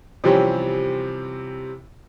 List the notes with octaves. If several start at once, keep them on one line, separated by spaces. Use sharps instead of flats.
C3 E3 F3 G3 C4 C#4